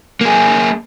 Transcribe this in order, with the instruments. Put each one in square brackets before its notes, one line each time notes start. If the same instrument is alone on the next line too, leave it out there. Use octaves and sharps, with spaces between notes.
[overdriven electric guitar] A#3 G#4